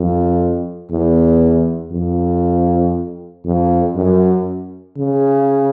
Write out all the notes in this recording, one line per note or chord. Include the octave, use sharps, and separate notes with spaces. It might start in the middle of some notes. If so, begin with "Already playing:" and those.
Already playing: F2
E2
F2
F2
F#2
C#3